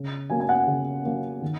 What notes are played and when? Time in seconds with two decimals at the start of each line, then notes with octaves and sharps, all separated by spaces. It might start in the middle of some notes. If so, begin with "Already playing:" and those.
Already playing: C#3
0.30 F#3 A#3 C#4 G#5
0.40 G#5
0.49 F#5
0.67 C#3
1.05 F#3 A#3 C#4
1.42 D#3